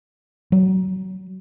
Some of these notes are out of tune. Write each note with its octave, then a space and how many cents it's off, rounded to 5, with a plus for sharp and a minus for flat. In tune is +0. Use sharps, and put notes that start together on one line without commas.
F#3 +25